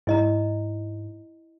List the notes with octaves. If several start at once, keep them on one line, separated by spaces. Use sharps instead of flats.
G#2 E4 D#5 A#5